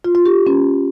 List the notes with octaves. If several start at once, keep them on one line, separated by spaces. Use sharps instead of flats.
F4
F4
G4
C#4